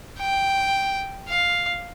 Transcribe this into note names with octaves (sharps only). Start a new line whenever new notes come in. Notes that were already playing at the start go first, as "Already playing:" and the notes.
G5
F5